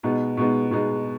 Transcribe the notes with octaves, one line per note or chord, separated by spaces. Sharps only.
B2 G#3 B3 D#4
B2 G#3 B3 D#4
B2 G#3 B3 D#4